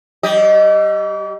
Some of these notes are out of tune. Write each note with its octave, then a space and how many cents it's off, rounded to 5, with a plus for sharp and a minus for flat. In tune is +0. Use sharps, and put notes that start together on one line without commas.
G3 -45 G4 +0 D#5 +0